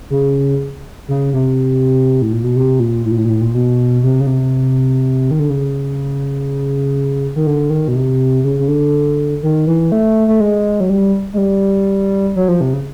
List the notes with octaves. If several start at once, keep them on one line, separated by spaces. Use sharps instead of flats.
C#3
C#3
C3
A2
A#2
B2
C3
A#2
A2
A#2
A2
A#2
A2
A#2
B2
C3
C#3
C3
D#3
D3
C#3
D#3
D3
D#3
B2
C3
C#3
C#3
D3
D#3
E3
A3
A3
G#3
F#3
G3
G#3
G3
F#3
F3
C3
C#3